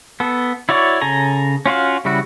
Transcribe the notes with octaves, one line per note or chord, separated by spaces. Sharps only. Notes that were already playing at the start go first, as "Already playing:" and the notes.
B3 A4
E4 F#4 C#5 D5
C#3 A4 G#5 A#5
C#4 F4 F#4 F5
C#3 G3 E4 F#4